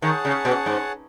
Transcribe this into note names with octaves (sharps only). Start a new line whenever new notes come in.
D#3 G#4 C#5 F#5 A5
C#3
B2
G#2